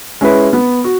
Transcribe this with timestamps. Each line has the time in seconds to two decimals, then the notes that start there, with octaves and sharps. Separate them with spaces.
0.21 G#3 C#4 E4 B4
0.53 B3
0.84 F#4